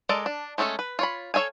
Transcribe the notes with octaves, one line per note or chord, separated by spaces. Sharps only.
G#3 A4 A#4 D5
D4
G#3 A3 C#4 D4 A4
B4
F4 C#5 B5
A4 C#5 E5 F5 G#5